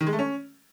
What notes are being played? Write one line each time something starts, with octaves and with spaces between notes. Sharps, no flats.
D#3
G#3
A3
C#4